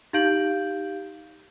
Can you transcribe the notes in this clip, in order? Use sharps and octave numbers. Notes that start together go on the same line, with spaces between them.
D#4 G4 F5 G6 D7 F#7